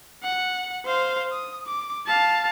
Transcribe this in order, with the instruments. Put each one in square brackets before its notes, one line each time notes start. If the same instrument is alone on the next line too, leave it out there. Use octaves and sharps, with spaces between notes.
[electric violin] F#5
C5 F5
D#6
D6
F5 A5